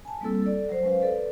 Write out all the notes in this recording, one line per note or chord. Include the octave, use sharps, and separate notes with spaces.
G#5 A5
G3 A#3 C4 E4 A4 E6
A4 D5
F#3 C5
G#3 C#4 B4 C5 F5
A4 B4 D5